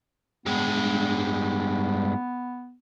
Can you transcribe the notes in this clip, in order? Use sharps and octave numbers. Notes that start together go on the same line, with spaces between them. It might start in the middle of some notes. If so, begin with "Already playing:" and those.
G2 G#3 B3